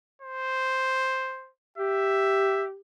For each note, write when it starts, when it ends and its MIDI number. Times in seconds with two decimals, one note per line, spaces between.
0.22 1.50 72
1.78 2.80 67
1.78 2.65 76